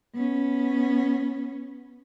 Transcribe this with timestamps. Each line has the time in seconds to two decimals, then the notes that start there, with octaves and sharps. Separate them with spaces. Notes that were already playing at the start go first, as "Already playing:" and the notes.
0.15 B3 C#4